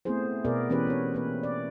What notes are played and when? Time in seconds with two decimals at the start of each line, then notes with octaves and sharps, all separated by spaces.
0.05 A3 B3 C4 E4 G#4 C5
0.45 B2 B3 G#4 A#4 D5
0.70 E3 B3 C#4 G4 G#4 B4
0.87 C4 C#5
1.14 A#3 B4
1.43 D5